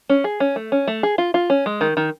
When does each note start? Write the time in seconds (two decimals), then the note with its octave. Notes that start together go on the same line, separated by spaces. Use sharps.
0.09 C#4
0.24 G#4
0.40 C#4
0.56 A3
0.72 C#4
0.87 A3
1.03 G#4
1.18 F4
1.34 F4
1.50 C#4
1.66 G#3
1.81 D#3
1.97 D#3